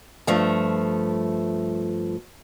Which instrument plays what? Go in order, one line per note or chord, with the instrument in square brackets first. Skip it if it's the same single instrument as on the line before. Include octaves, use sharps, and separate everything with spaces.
[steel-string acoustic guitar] G2 F3 A3